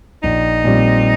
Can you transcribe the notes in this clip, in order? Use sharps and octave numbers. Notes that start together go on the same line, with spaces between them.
A#1 D#4
A#2 G3 C4